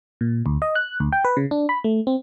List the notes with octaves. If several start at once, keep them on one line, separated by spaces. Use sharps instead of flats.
A#2
D2
D#5
F#6
D2
G5
B4
C#3
D4
B5
A3
C4